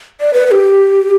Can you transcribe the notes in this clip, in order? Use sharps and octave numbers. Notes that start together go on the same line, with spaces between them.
D5
B4
B4
G4